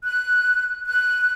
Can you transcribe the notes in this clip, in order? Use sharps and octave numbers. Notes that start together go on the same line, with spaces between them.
F#6
F#6